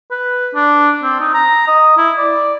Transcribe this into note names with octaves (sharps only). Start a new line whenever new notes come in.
B4
D4
C4
D#4
A#5
D#5
E4
D5